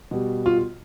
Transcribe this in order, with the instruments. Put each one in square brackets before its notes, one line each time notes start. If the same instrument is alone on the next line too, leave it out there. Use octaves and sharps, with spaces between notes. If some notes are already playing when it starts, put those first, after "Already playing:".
[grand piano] B2 G3
F4